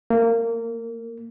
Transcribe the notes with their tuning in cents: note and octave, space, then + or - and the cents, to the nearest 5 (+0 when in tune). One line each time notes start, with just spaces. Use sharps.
A#3 -20